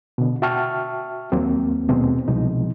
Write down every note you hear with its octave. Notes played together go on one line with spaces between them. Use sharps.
B2 D3
F#4 E5 G5 A5 C#6 F6
D#2 F#3 A#3 C4
D#2 B2 D#3 G#3 B3 C4
C2 B2 F3 G#3 D#4